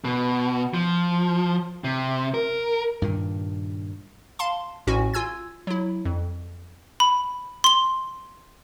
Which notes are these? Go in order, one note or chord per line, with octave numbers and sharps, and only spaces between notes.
B2
F3
C3
A#4
G2 A#2 D#3
F5 A5 C6
A1 A2 C#4 F#4 G#5
F4 G#5 E6 G#6
F#3 E4
F2
B5
C6 G7